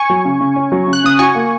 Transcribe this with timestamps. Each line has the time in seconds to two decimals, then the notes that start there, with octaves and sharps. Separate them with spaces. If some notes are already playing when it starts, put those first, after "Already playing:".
Already playing: G#5 C#6
0.10 F#3
0.25 C#3
0.41 C#3
0.56 C#4
0.72 F#3
0.87 C#3
0.93 F#6
1.04 C#3 D#6
1.19 F#4 G#5 C#6
1.35 A#3